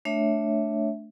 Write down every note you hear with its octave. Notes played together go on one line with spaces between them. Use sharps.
A3 D4 C#5 E5